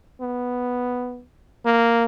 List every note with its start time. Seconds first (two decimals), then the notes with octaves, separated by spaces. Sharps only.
0.21 B3
1.65 A#3